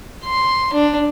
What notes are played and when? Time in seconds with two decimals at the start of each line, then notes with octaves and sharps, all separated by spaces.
0.25 C6
0.73 D4